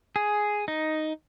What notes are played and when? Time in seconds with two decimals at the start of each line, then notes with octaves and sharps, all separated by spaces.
0.16 G#4
0.68 D#4